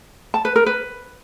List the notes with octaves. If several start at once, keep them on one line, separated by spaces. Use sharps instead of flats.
A5
B4
A#4
B4